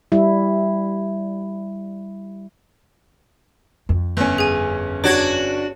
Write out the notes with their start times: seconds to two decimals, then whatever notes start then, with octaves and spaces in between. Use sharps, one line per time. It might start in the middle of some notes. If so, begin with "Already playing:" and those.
0.12 G3 E4
3.89 F2
4.17 G1 C#4
4.38 G#4 G#5
5.04 D4 F#4 C#5 G#6